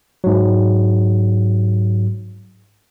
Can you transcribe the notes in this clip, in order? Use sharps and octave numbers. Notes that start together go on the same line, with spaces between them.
G#2 F#3